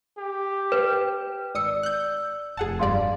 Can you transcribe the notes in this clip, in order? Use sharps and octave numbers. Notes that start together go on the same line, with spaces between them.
G4
B4
G#1 D5 D#6 E6 C#7
F#6 G6
F1 G#4 F#5 A5
G2 G3 D5 F5 C6